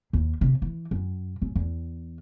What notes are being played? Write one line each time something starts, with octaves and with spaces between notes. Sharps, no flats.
D#2
C3
E3
F#2
F#2
E2